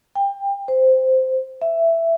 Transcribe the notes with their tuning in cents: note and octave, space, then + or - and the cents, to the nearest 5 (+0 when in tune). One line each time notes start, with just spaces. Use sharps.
G5 +25
C5 -5
E5 +10